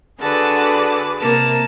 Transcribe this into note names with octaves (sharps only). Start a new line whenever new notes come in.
D3 F#4 G#4 B4 A5 D6
C3 A#3 A5